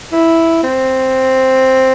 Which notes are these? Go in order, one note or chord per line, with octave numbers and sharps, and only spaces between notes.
E4
C4